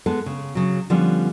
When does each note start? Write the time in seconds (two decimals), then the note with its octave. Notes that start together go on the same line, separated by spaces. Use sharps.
0.06 G#3 B3 A4
0.26 C#3
0.55 C#3 F#3
0.90 D3 F3 G3 B3 C#4